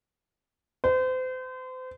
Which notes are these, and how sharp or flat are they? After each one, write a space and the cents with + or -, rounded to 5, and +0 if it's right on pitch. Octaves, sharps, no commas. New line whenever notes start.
C5 -35